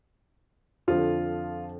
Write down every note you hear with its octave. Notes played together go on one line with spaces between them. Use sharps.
F2 D3 F3 F4